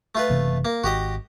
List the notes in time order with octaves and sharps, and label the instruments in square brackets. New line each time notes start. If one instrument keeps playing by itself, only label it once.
[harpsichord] A3 F4 B4
[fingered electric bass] F#1 C3 E3
[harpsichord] A#3
[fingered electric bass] G#1 [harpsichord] F#4 G4 D#5